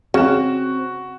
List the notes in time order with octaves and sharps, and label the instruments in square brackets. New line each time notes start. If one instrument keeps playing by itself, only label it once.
[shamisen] C#3 [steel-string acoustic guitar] C4 [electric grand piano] F#4 E7